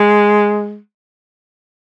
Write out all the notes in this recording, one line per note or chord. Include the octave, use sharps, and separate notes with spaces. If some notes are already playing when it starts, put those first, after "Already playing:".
Already playing: G#3